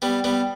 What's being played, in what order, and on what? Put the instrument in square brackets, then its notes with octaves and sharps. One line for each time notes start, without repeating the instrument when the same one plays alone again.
[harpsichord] G3 B3
G3 B3